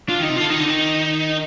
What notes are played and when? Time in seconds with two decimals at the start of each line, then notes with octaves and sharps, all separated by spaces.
0.09 D4 F4
0.20 D#3 D#4
0.30 C3
0.36 D3 F4
0.50 D#3 D#4
0.60 D3
0.69 D#3